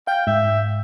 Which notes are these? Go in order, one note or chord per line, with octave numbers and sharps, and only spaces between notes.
F5 G5 G6
G#2 E5